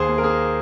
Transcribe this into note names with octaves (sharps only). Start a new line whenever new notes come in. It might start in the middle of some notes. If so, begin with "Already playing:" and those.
Already playing: D#2 G#4 C5
A#3
A#4
A#3 G#4